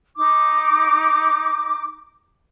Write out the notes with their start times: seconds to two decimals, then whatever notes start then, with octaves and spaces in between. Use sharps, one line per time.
0.16 D#4 D6